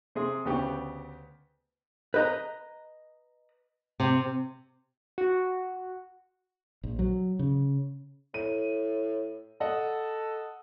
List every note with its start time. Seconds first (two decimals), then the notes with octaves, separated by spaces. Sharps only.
0.15 C3 G#4 C6
0.45 D2 C#3 B3 G4 D5 C#6
2.14 B4 D#5 A#5
4.00 C3
5.18 F#4
6.83 A#1
6.99 F#3
7.39 C#3
8.34 A2 D#7
9.61 A4 D#5 F#5